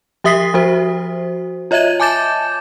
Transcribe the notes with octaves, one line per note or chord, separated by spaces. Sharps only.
F3 G4 E5 D#6 B6 C7
F3 F#4 C5
F4 C#5 D#5 E5 G#6 D#7
G#5 A5 D6 G6 A6 E7